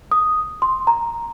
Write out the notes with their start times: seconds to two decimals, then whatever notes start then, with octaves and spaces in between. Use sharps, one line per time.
0.11 D#6
0.62 C6
0.87 A#5